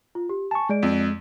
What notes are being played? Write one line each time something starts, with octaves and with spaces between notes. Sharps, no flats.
F4
G4
G#5 A5 C#6
G#3 G#4 D5 D7
F2